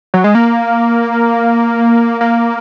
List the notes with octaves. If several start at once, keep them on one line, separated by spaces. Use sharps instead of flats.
F#3
G#3
A#3
A#3